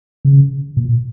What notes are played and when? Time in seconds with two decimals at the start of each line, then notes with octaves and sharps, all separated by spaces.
0.25 C#3
0.77 A#2